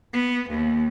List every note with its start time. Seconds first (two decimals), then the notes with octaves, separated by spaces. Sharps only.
0.13 B3
0.50 D#2